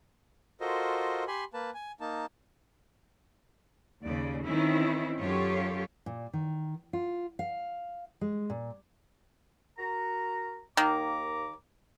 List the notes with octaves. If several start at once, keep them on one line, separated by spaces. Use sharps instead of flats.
F4 F#4 A4 A#4 C5 D#5
G4 G#5 B5 C6
A#3 B4 A5
G#5
A#3 D#4 A5
D#2 C#3 D5
D#3 E3 C4 C#4 D#4 E4
F#2 F#3 F4 G4 A4 C#5
A#2
D#3
F4
F5
G#3
A#2
F#4 A#4 A#5
D#2 D#3 A#3 A#5 D6